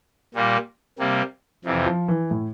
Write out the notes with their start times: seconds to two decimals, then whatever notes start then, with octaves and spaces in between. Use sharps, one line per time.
0.35 A#2 G3 A#3
0.99 C3 G3 A#3
1.65 F2 C3 E3
1.86 F3
2.08 E3
2.31 A2